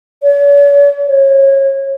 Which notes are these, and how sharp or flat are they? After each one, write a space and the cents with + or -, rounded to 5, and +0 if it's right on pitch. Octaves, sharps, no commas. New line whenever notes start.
C#5 +45
C#5 -25